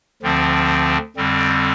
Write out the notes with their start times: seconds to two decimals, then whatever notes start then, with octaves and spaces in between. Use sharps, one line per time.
0.22 D2 D3 F3 C4
1.16 F2 D3 G3 C4